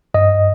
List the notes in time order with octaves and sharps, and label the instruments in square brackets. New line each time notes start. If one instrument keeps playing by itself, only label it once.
[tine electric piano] G2 D#5